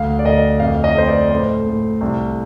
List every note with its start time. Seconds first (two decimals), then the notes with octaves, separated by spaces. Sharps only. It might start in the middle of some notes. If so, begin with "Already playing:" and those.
Already playing: D2 F5
0.19 D5
0.25 D2 D#5
0.60 F2 F5
0.84 D#5
0.95 A3 C5
1.07 D5
1.31 A2 C5
1.66 A2
2.01 C2